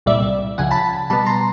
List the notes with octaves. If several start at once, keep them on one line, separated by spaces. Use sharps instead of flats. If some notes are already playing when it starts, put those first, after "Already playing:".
C2 A#2 G3 D5 E5
C#2 C#3 F3 F#5 G#5
A5 B5
B2 G3 B3 A5 B5
A#5 C6